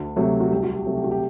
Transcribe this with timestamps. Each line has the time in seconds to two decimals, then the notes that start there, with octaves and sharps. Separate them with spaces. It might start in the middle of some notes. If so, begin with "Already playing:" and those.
Already playing: D2
0.16 C3 F#3 A3
0.40 F#4
0.51 C2 G4
0.63 F#4
0.74 G4
0.86 C3 F#3 A3
0.97 G4
1.04 F#4
1.11 G4